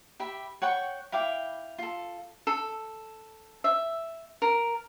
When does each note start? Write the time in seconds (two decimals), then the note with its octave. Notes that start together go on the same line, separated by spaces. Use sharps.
0.20 G4 E5 B5
0.62 C#5 F#5 G5 C#6
1.12 E4 F5 G5 D6
1.78 F4 A4
2.47 A4
3.64 E5
4.42 A#4